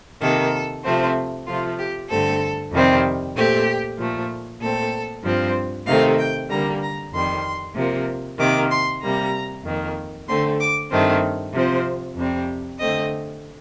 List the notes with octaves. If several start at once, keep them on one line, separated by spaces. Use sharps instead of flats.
C3 D#3 A#3 A4
C3 F3 A3 C4
C3 F3 A3 F4
G4
G2 D3 A3 C4 A4
F2 C3 D#3 G3 C4
A#2 A3 C4 G4
A#2 F3 A3
A#2 A3 C4 A4
G2 F3 C4
C3 D#3 A3 C4 F5
G5
D3 G3 A#3 A#5
A#5
F2 D#3 G3 C6
C3 F3 A#3
C3 D#3 A#3 D6
C6
C3 G3 A#3 A#5
F2 D#3 A#3
D3 A3 C4 C6
D6
G2 D#3 A3 C4
C3 F3 C4
F2 C3 G3 C4
D3 A3 C4 D#5